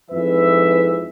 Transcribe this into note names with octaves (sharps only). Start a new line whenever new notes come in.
F2 G#2 E3 B4 E5